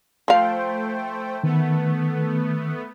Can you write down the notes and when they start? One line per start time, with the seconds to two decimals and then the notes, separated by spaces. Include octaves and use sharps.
0.28 F3 A3 C5 F5 G5
1.44 D#3 A3 B3